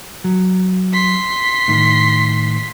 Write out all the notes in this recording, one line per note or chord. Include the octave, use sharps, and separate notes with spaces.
F#3
C6 B6
A2 D#3